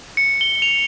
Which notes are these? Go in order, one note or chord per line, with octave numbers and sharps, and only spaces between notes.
C#7
G7
F7